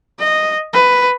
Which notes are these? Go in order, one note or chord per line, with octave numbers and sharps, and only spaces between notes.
D#5
B4